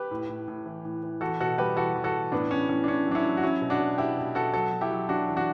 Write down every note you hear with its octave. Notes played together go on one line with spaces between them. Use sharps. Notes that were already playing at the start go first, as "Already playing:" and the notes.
Already playing: G4 B4
A2
A2
A2
E3
A2
E3
E2 F#4 A4
B2 F#4 A4
G3 G4 B4
E2 F#4 A4
E2
F#4 A4
E2
A2 B3 D4
A2 C#4
A2 C#4
D4
A2 C#4
F#3
D4
C#4 E4
F#3
F#4
F#3 C#4 E4
B2
D4 F#4
B2
B2 E4 G4
B2
B2 F#4 A4
F#3 F#4 A4
F#3
E4 G4
F#3
F#3 D4 F#4
E2
D4 F#4